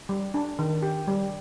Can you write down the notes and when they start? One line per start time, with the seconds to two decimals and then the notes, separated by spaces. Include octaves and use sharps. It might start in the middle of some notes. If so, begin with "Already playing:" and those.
0.09 G3
0.34 D4
0.59 D#3
0.83 G4
1.08 G3